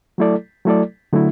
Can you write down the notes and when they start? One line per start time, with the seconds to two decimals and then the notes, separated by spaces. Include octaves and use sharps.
0.18 F#3 A3 E4 A4 D5
0.65 F#3 A3 E4 A4 D5
1.13 D3 F#3 A3 E4